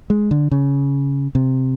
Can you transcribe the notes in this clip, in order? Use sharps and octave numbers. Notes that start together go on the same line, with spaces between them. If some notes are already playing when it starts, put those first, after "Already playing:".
G#3
D3
C#3
C3